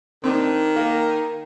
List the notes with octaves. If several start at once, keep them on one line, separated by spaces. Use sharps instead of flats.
D#3 C4 D4
A#3 A#4